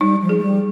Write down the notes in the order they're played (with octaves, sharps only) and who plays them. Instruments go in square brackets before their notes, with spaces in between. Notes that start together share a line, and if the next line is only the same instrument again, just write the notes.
[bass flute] G3 [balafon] D#4
[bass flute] F3
[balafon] G#4
[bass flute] G#3
G3